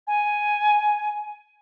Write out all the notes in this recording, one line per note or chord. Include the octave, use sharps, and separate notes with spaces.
G#5